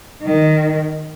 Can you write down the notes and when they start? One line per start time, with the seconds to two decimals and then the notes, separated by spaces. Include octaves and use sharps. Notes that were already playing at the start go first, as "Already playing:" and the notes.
0.23 D#3